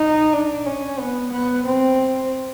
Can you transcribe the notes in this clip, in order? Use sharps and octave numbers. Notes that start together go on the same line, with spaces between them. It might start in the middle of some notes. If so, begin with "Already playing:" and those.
Already playing: D#4
D4
C#4
B3
B3
C4